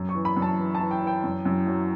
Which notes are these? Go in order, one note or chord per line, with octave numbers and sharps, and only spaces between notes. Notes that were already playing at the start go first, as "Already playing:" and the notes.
Already playing: F#2
C#6
E3
B5
F#2
A5
E3
A5
E3
G5
E3 G5
F#2
F#2
F#3